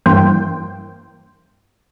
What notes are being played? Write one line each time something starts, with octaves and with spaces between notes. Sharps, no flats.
G2 E3 A#3 C5 G5